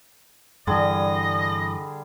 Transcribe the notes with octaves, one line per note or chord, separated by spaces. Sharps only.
G2 D3 E3 G3 G#4 D#5